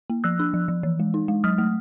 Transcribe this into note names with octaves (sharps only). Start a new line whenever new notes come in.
A#3
F3 E6 F#6
D4
F3
F3
E3
G#3
D#4
G#3
F#3 D#6 F6
A3